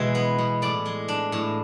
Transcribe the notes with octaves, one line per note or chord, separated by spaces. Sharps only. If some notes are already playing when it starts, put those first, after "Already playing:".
Already playing: B2 E3 G#3 E5
B3
B2
A2 D5
G#3
D4
A2